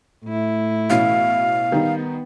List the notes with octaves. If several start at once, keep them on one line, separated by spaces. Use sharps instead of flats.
A2 E4
B2 E3 C#4 F5
D#3 G3 B3 D#4